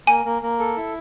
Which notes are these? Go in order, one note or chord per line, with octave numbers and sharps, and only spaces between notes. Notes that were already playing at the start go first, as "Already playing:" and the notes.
A#3 G#5
A#3
A#3
A4
E4